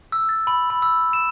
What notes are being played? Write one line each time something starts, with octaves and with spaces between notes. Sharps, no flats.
E6
A6
B5
B5
E6
E7